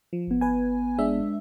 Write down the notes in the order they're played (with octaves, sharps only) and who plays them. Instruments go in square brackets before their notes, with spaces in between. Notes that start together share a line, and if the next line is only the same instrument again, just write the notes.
[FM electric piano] F3
[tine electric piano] G1 B3
[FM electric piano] B4 G#5
G#3 D4 E5